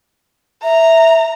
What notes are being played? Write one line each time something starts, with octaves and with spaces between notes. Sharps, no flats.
E5 A#5